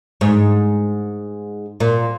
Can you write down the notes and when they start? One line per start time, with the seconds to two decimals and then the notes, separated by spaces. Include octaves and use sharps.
0.21 G#2
1.80 A#2